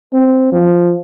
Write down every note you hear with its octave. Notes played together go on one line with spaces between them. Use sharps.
C4
F3